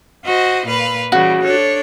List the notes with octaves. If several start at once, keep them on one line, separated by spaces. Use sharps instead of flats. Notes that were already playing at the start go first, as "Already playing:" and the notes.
F#4 C5 D#5
A#2 B4 F5
C#3 E3 G3 F#4
D4 A4 C#5